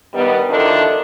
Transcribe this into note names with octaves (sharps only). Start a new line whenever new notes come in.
G2 D#3 G3 B3
D3 D#3 F3 D4 E4 A4